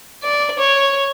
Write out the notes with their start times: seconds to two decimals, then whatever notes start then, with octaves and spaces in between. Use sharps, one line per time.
0.23 D5
0.59 C#5